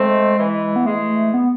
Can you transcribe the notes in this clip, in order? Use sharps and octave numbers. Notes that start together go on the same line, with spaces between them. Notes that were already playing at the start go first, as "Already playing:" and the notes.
Already playing: G#3 A3 C4
E3
B3
E3 G#3 A3
B3